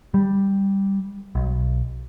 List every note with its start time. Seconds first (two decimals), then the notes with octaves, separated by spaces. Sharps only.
0.14 G3
1.35 B1